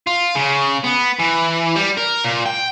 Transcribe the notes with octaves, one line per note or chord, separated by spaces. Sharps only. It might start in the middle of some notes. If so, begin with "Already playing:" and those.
F4
C#3
B3
E3
G3
A#4
A#2
G5